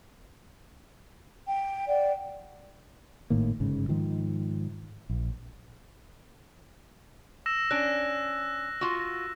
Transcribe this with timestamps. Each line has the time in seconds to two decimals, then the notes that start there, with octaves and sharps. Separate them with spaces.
1.46 G5
1.87 D5 F#5 G5
3.30 G#1 A2 D#3 A#3
3.60 G1 G#2 C#3
3.88 G#2 D#3 F3
5.10 A#1
7.46 E6 A#6 E7
7.71 C#4 D4 F#6
8.81 F4 F#4